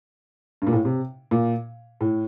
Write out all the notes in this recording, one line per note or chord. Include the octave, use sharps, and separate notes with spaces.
G2
A#2
A2
C3
A#2
A2